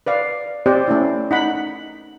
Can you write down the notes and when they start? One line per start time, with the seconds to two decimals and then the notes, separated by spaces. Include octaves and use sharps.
0.06 B4 D5 F5
0.66 C4 G4 C5 D5 D#5 G5
0.86 A3 C#4 E4 D5
1.31 D#4 F#5 B5